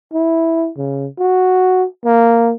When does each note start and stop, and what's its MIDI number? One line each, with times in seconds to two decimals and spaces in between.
0.13 0.70 64
0.77 1.07 49
1.19 1.85 66
2.05 2.53 58